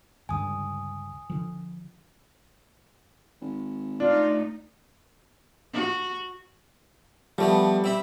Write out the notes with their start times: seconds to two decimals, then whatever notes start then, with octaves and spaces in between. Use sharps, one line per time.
0.29 C#2 G2 D3 G#5 D#6
1.30 D3 F3
3.41 G#1
4.00 A3 D4 D#4 F4
5.73 F#4
7.38 F3 G3 A3 B3
7.84 C4 E5 B5